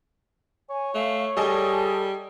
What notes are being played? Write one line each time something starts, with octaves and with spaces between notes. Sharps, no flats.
C#5 G#5
A3 F5
G3 G#4 A4 D#5 A5